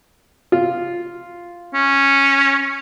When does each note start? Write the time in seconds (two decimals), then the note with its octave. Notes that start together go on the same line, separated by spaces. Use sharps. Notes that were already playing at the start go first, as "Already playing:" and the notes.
0.52 F4
1.74 C#4